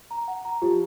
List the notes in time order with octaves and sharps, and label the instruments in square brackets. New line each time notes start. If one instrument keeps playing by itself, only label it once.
[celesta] A#5
F#5
A#5
[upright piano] F3 [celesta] G4